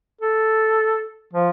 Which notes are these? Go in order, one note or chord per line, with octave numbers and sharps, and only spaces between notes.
A4
F3